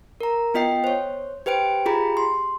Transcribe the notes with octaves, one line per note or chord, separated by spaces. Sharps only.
A#4 A#5
B3 F4 D#5 G5 C7
C5 C#5
G4 B4 C5 G5 D7
F4 G4 G#4 A#5 B5
C6